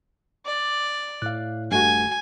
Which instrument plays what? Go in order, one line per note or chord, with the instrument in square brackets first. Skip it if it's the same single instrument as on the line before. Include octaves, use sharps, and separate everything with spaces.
[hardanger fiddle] D5
[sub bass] A2 [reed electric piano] F5 F#6
[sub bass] D#1 [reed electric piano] G2 A3 F#4 [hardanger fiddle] G#5